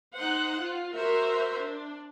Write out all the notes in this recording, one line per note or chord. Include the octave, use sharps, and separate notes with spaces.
D#4 C5 F#5
F4
F#4 A#4 C5 E5
D4